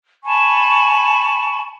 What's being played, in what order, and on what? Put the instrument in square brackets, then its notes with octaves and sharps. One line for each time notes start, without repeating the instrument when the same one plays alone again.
[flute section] G#5 A5 B5 C#6